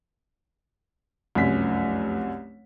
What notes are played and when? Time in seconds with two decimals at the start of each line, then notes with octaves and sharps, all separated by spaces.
1.35 F1 C2 F#2 B6